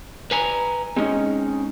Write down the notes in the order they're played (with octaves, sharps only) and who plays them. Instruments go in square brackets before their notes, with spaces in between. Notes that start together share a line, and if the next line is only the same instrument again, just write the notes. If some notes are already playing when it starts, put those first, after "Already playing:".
[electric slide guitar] B4 G#5 A#5
[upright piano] G#3 D#4 [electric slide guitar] C4 C#4